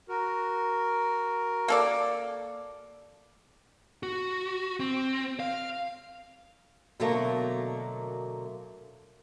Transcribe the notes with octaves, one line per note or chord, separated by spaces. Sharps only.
F#4 A#4
A#3 A4 D5
F#4
C4
F5
B2 D3 F#3 A3 A#3